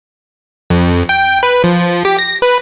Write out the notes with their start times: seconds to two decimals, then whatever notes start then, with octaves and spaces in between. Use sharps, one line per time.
0.70 F2
1.09 G5
1.43 B4
1.64 F3
2.05 G4
2.19 A#6
2.42 B4